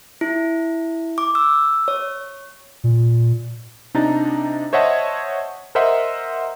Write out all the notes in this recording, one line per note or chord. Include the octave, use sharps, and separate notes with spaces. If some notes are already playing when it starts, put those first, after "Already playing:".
E4
D6
E6
C#5
A#2
C3 D4 D#4 A#5 A6
C5 C#5 D#5 E5 F#5 A5
A#4 C5 D#5 E5 F#5 C6